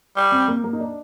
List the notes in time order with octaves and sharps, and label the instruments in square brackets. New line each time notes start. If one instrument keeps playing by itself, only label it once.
[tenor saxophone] G3
[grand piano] C4
A#3
A#3
D#4
D4